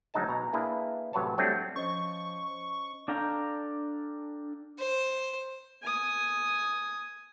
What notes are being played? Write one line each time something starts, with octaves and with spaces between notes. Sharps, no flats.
D2 F#3 G#3 D#4 D#5 A5
B2 A#5
A#3 D4 E4 G#4 B4
A1 C3 F#3 B4 C#5 A5
F#3 G3 A3 C4 D4
F3 C#4 C5 D#5 C#6
D4 A4 F5 G5 A#5
C5
G#5 D#6